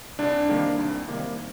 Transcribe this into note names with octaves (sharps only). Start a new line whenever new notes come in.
C2 D4
C3 D#3 G3 A#3
C2
C3 D#3 G3 A#3